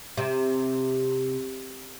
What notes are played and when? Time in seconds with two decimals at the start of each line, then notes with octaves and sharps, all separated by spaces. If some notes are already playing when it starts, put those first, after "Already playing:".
0.17 C3